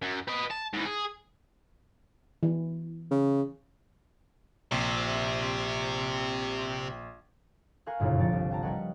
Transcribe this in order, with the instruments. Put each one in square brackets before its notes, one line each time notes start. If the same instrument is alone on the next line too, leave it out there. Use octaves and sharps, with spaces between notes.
[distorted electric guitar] F#2
B4 D#5
A5
G#2 E3
G#4
[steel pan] E3
[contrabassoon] C#3
[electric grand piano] A#1 [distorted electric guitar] C3
[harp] A#4 F5 G#5 C#6 F6 F#6
G1 F#2 A#2 C#3 E4
C3 F3 D5 A6 C#7
C2
G5 A5 A#5
G3 A#4 B4 C#5 D#5 F#5